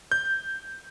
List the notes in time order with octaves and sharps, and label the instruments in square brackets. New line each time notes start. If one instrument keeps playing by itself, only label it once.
[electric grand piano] G6